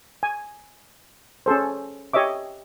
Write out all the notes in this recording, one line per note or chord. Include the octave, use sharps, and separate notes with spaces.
G#5
C#4 G#4 A4 C5
G4 C#5 D#5 E5 D6